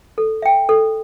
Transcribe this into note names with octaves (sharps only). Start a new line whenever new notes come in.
A4
E5 G5
A4